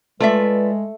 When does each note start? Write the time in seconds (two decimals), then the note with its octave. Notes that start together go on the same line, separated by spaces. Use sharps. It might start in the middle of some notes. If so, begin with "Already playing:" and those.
0.20 G#3 A3 F4 B4 D5 E5